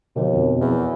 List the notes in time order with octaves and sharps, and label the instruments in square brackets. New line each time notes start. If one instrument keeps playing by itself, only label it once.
[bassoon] D#2 [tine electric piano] B2 D3 F3
[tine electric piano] F2 B2
[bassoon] E2